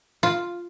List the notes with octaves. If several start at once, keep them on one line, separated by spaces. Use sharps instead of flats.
F4